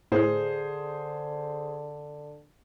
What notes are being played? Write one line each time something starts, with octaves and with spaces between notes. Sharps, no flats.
A2 D3 G#4 C5